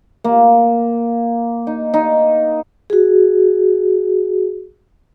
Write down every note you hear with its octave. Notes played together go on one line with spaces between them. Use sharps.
A#3
D#4
D#4
F#4 G#4